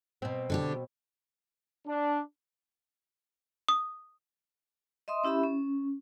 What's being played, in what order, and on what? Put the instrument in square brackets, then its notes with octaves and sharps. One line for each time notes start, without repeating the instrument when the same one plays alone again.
[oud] B2 C4
[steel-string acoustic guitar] D3 D4 G4
[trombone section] D4
[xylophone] D#6
[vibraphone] D#5 E5 C6 D#6
C#4 E4 G4 E5 B5
C#4